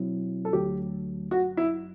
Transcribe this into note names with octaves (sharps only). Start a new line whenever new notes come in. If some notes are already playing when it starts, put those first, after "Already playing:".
Already playing: B2 F#3 C4 E4
A4
D2 D3 F#3 A3 G4
G1 F#2 F#3 F#4
E4